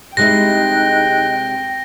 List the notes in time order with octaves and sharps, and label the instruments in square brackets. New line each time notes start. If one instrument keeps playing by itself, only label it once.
[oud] C3 G#3 E4 [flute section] D#4 D#5 F#6 [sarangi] G5 [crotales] A#6